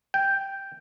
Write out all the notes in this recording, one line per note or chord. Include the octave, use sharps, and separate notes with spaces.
G5